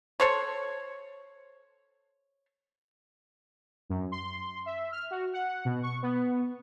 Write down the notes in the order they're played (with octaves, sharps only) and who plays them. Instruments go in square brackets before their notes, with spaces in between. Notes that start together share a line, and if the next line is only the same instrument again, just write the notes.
[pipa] A4 C5 C#5
[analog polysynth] F#2
C6
E5
F6
F#4
F#5
B2
C#6
B3